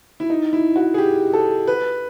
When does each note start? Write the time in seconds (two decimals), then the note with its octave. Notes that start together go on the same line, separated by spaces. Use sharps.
0.20 E4
0.30 D#4
0.53 E4
0.76 F#4
0.94 G#4
0.98 G4
1.33 A4
1.67 B4